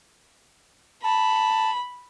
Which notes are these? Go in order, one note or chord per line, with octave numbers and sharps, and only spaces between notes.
A5 B5